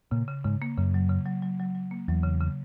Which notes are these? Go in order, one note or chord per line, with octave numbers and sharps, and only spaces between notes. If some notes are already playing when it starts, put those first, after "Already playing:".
A#2 C#3
C#3
G#2 C#3
A#3
F#2 C#3
F#3
C#3
F#3
F#3
F#3
F#3
A#3
E2 F#3
C#3
C#3